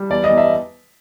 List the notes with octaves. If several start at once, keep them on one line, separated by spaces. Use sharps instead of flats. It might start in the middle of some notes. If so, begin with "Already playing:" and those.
Already playing: G3
E2 D5
D#5
E2
E5